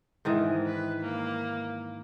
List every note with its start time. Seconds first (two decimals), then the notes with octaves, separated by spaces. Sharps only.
0.25 G#2 D#3 E3
0.66 B4
1.01 A#3